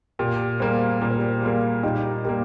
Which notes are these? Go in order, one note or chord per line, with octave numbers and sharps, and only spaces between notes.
A#2 G4 A#4
G3 A#3 G#4 C5
A#2 A#4
C5
G4 A#4
G3 A#3 F4 G#4
A#2 D#4 G4
G3 A#3 G4 A#4